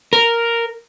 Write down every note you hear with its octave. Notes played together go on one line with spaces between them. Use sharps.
A#4